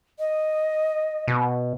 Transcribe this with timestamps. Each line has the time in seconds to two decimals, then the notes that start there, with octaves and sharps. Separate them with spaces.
0.19 D#5
1.28 B2